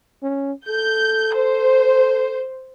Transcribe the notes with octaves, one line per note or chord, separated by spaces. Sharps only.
C#4
A4 G6
C5